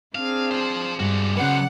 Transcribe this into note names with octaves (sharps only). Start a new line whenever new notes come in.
C4 D4 G#4 F5
F4 C5
G2 G#3 F#4 D5
C#3 F#3 B4 C5 F#5